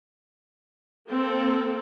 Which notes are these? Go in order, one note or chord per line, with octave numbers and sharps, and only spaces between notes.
A#3 C4 A4